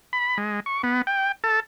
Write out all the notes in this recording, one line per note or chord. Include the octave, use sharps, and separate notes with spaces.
B5
G#3
C#6
B3
G5
A4